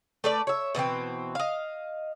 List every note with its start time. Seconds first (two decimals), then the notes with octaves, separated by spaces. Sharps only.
0.24 A3 B4 D5
0.47 C#5 E5
0.75 B2 E3 A3 C4
1.35 D#5 F5